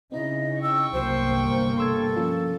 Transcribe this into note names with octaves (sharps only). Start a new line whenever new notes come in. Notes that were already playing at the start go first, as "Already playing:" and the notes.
C#3 C4 D#4 E4 D#5
G5 C#6 E6
G1 C2 C3 F#3 A#3 C5 E6
A4 C6 E6 G#6
F3 C#4 F4